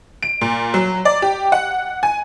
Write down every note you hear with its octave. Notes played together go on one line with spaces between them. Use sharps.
D7
A#2
F#3
D5
G4
F#5
G#5